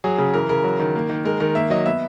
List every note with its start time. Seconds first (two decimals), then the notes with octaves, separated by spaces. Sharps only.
0.04 F#3 G#4
0.18 C#3
0.33 E3 A#4
0.49 C#3 A#4
0.64 F#3
0.80 D#3
0.95 A#3
1.09 D#3
1.25 G#3 A#4
1.40 D#3 A#4
1.55 A#3 E5
1.70 F#3 D#5
1.86 B3 E5